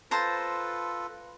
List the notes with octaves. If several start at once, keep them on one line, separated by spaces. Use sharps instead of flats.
F4 A4 B4 C5 A5 A#5